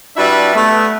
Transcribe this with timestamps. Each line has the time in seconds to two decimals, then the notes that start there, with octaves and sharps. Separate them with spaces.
0.17 G3 D4 E4 F#4 B4 E5
0.55 A3 B3